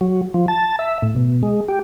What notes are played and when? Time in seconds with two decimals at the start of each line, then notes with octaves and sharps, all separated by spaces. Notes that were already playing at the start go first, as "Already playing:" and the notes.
0.01 F#3
0.34 F3
0.48 A5
0.79 E5
1.02 A2
1.16 B2
1.43 G#3
1.68 G4